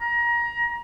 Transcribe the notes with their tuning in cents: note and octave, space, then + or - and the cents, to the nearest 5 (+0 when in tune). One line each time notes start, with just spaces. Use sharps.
A#5 +25